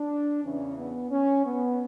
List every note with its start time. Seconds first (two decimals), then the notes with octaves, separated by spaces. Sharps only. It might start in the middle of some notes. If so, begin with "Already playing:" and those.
Already playing: D4
0.43 E2 C#3 E3 C#4
0.78 B3
1.11 C#4
1.46 B3